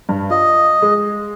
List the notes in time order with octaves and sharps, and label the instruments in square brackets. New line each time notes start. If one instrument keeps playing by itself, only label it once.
[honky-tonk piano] G2
[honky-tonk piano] F4 [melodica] D#5
[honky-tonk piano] G#3